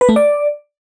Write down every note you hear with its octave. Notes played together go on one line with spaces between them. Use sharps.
B4
A3
D5